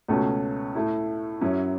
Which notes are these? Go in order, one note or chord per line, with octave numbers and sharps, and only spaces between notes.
C#2 B2 A3 C#4
A2 A3 E4
F#2 F#3 C#4 E4